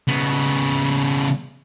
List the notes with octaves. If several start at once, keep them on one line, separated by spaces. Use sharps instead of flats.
C#3 B3